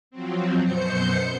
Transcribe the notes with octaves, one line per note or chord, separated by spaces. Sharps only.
F3 F#3 C4
F#2 B2 C5 G6 C#7